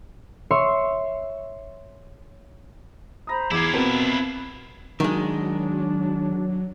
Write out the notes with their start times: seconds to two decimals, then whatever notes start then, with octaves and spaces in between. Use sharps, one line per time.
0.51 C#5 E5 C6
3.27 C5 A#5 B5 D#6 A#6
3.51 E2 E3 E4 F4 D6 G#6
3.74 B2 C4 A#4 B4
5.00 D#3 F#3 G#3 D4